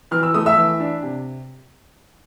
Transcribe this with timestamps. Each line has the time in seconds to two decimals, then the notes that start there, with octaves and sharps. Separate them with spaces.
0.11 E3 F6
0.23 E6
0.34 A3 D#6
0.46 E5 E6
0.57 E3
0.80 D4
1.03 C3